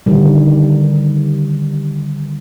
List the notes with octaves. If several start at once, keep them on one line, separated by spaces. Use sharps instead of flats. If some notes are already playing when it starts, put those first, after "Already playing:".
D3 D#3 G3